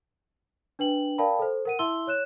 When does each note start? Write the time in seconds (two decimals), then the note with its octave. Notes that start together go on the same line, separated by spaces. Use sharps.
0.79 D4 B4 G5 F#7
1.18 A#4 D5 F5 G5 A5 B5
1.39 A4 C5
1.65 A#4 F#5 D#7
1.79 E4 E5 C6 E6 G7
2.07 C#5 F#6 E7